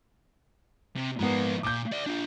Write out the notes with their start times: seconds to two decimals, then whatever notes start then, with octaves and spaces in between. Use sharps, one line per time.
0.96 C3
1.19 G#2 F3 A#3 B3
1.63 A#2 D6 G6
1.92 D5 E5
2.07 D4 F4